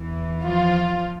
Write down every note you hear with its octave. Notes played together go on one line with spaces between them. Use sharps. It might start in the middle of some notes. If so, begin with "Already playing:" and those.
Already playing: E2 E3
F3 F4